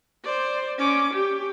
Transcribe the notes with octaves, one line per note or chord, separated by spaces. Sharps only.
C5 D5
C#4 D6
G4